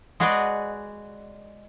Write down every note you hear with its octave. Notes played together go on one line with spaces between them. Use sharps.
G#3 F#4 G#4 B4 D5 D#5